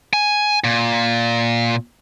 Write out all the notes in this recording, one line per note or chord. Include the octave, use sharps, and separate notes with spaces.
G#5
A#2